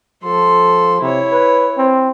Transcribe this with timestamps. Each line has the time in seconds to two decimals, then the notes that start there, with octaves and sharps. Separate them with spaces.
0.24 F3 A4 C6
1.02 C3 E4 C#5
1.32 B4
1.78 C4